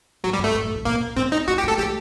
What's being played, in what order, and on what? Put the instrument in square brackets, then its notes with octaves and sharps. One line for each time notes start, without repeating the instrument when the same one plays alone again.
[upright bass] A2 [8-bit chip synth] F#3
[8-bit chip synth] G3
[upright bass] G2
[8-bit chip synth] A3
[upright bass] G2
A2
A2
[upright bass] A#2 [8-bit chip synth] A#3
[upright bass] A2 [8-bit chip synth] C4
[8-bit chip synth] D#4
[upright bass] A3 [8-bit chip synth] F#4
[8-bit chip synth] G4
[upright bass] A3
[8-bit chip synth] A4
[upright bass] A3 [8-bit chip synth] G4